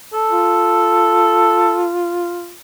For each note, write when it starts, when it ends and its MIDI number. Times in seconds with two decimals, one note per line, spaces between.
0.13 1.86 69
0.30 2.53 65